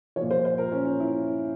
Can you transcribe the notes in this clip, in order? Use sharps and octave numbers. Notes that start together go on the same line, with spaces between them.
A#2 F3 C#5
C5
C5
A#4
C#4
C#4
E4